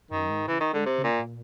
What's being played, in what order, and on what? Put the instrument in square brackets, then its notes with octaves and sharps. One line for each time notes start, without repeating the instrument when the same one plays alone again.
[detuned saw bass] F#2 [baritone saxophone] D#3
[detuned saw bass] G#2
[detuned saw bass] C#3 [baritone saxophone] E3
[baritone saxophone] D#3
[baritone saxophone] D3 [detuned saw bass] G#3
[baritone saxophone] C3
[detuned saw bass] C#3
[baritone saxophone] A#2
[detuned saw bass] A2
A#2